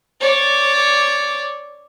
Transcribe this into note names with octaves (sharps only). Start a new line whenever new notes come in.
C#5 D5